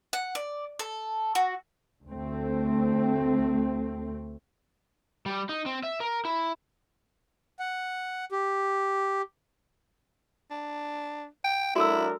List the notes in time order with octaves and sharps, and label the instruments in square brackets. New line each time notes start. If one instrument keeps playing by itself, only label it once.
[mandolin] F#5
D5
A4
F#4
[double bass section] D2 A3 C4
[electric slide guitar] G3
D#4
C4
E5
A#4
E4
[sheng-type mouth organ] F#5
G4
[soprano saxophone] D4
G5
[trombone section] F#3 D4 A#4 [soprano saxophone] E4 [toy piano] F#4 A4 E6